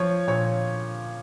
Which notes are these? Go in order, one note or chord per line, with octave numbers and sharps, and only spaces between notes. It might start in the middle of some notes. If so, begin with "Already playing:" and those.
Already playing: F3 C#5
A#2 C#5